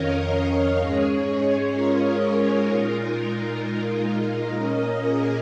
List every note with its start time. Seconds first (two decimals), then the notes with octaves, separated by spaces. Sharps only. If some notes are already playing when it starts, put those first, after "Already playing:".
Already playing: F2 D#3 C#4 A#4 C#5 D#5 F5
0.17 A#4 D#5
0.49 A#4 D#5
0.80 G#2 G#3 C#4 G#4 C#5
1.27 G#4
1.74 F4 A#4
2.68 A#2 G#3 D#4
4.55 A#2 A#3 C#4 A#4 D#5
5.03 G#4